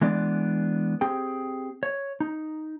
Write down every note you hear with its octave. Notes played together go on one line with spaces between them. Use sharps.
E3 G#3 B3 D4 D5
C4 G4 G#4 G5
C#5
D#4